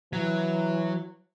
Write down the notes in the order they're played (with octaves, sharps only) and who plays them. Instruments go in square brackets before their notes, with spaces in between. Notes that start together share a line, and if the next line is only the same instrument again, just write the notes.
[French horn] E3 [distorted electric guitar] F#3